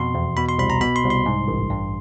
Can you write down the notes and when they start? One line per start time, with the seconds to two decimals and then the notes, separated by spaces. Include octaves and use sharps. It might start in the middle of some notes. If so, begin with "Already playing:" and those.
Already playing: F2 B2 C6
0.15 E2
0.37 B2 B5
0.49 C6
0.58 C2 B5
0.70 A#5
0.81 B2 B5
0.96 C6
1.04 C2
1.10 C6
1.26 G#2
1.48 A1
1.70 G2